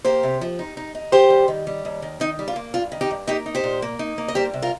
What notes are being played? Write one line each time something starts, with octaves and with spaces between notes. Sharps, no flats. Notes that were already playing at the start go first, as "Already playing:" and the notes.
A#3 G4 C5
C3
F3
D#4
D#4
D#4
D#2 G4 C5
G3
D#3
G3
D#2
D#3
D#3 D#4
G3
F4
A#3
G2 F4
D#3
D#4 G4
G2
A#3 D#4 G4
D#4
G4 C5
A#2
A#3
D#4
A#3
D#5
G3 G4 C5
C3
F4 A#4